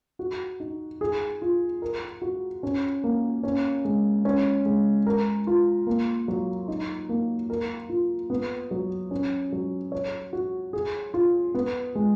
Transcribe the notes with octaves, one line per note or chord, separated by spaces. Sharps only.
F#4
D#4
G#4
F4
A#4
F#4
C#4
A#3
C#4
G#3
C#4
G#3
A#4
F4
A#3
F#3
D#4
A#3
A#4
F4
B3
F#3
C#4
F#3
C#5
F#4
G#4
F4
B3
G#3